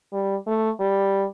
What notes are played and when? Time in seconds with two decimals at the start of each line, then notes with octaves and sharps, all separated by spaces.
0.13 G3
0.47 A3
0.80 G3